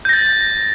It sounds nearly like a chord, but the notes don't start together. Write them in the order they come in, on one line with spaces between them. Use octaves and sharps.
G6 A#6 A6